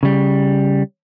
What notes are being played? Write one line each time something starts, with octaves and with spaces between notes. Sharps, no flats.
C#3 G3